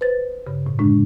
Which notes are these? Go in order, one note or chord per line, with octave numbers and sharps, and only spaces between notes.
B4 C5 A6
G2 C#3
A2
F#2 A2 D3 G#3 D4